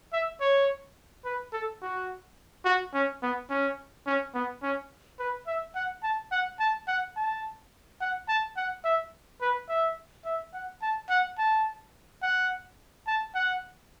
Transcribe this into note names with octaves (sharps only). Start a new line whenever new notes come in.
E5
C#5
B4
A4
F#4
F#4
C#4
B3
C#4
C#4
B3
C#4
B4
E5
F#5
A5
F#5
A5
F#5
A5
F#5
A5
F#5
E5
B4
E5
E5
F#5
A5
F#5
A5
F#5
A5
F#5